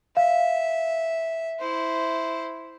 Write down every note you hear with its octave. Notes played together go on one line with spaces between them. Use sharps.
E5 F5
E4 C5